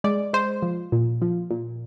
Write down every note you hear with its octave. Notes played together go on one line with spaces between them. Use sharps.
G#3 D5
G#3 C5
F3
A#2
F3
A#2